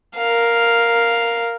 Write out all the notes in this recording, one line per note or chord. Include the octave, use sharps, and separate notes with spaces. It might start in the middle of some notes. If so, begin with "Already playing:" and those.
A#4 F5